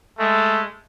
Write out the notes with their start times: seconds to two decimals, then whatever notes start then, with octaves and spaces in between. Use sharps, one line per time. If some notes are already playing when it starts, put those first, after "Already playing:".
0.19 G#3 A3